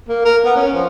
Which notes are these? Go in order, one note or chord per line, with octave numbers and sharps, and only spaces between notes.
A#3
A#4
B3
C#4
F3